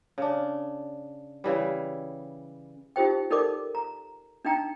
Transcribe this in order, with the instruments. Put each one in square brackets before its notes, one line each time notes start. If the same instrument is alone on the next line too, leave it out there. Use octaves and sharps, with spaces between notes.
[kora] C#3 D4
C#3 E3 G3
[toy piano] D#4 F4 G4 C5 G5
D#4 A4 A#4 D5 D6
A#5
D4 D#4 G5 A#5